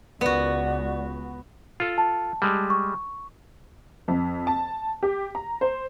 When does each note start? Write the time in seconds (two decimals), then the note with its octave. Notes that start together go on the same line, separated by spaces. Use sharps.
0.21 C#2 B3 F#4 D5
1.80 F4 A4
1.98 A5
2.42 G3 G#3
2.70 C#6
4.08 F2
4.47 A5
5.03 G4
5.35 A#5
5.61 C5